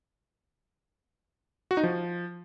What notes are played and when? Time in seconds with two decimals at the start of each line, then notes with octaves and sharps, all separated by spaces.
1.71 F#4
1.77 D#4
1.83 F3